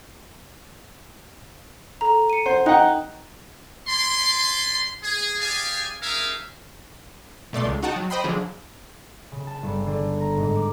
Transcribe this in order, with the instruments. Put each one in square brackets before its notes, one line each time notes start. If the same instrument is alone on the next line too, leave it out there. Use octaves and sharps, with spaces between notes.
[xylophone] A4 A#5
C#7 D#7
[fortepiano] C5 [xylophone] F#5
[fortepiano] D#4 F#5 [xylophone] G5 A#5 F#6
[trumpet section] D5 G#5 B5 C6
G#4
G4 G#4 D5 F5 G#5
C#4 D#4 G#4 A#4 E5 F5
[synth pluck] B2 A3 D5 C6
C#2
D#4 F#4 F#5 G5 A5
F#3
C5 D#5 G5 B5 C6
D3 F3 F#3 G#4
[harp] C#3
A5
G1
D3
A#5
G#2
D6